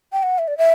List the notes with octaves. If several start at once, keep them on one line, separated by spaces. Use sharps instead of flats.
G5
F#5
E5
D5
E5